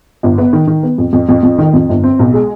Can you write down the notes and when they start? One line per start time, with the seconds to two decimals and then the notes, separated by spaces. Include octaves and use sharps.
0.23 G1
0.38 B3
0.53 D#3
0.67 D#3
0.83 B3
0.98 F2
1.13 F2
1.29 F2
1.43 F2
1.58 D#3
1.74 F2
1.89 G1
2.04 C4
2.19 B1
2.34 G#3